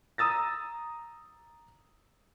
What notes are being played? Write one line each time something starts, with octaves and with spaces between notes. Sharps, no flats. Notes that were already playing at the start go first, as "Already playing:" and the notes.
A#5 D#6 E6 A6 A#6